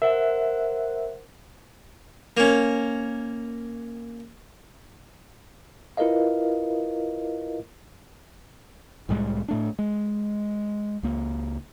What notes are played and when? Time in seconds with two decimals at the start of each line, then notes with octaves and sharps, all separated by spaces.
0.02 A#4 C5 E5 F#5
2.37 A#3 C#4
5.97 E4 F4 A#4 B4 D#5 F5
9.09 C2 A2 G3 G#3
9.48 A2 A3 D4
9.79 G#3
11.03 C#2 A#3